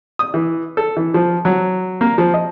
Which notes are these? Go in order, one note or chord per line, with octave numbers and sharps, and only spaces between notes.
D#6
E3
A4
E3
F3
F#3
A#3
F3
D#5